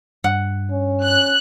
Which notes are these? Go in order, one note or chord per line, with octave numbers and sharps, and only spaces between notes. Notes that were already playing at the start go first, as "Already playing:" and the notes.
G2 F#5
C#4
F#6